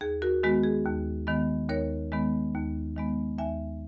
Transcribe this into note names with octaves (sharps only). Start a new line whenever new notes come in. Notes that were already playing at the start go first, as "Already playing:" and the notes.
D#2 G#4
F#4 A#4
D#3 G#3 B3 F#4
G#4
D#2
D#3 G#3 B3
D#2 A#4 C#5
D#3 G#3 B3
D#2
D#3 G#3 B3
D#2 E5 G#5